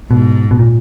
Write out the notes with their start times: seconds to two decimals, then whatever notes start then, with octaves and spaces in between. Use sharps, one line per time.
0.10 G#2 B2
0.51 B2
0.59 A#2